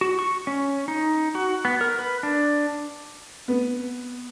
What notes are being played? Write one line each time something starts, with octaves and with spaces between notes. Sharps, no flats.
F#4
C#6
C#4
D#4
F#4
B3
A#4
B4
D4
B3